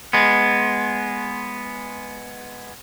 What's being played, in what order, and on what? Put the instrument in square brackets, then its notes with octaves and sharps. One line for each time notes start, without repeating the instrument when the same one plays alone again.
[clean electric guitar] G#3 B3